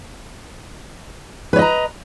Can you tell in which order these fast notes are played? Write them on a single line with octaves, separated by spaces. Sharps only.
B4 C#5 D#5 A#5